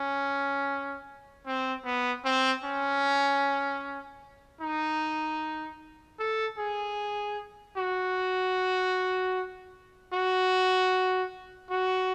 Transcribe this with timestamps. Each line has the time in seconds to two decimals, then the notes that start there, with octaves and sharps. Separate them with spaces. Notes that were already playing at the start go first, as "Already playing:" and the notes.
Already playing: C#4
1.46 C4
1.85 B3
2.25 C4
2.64 C#4
4.61 D#4
6.19 A4
6.58 G#4
7.77 F#4
10.14 F#4
11.70 F#4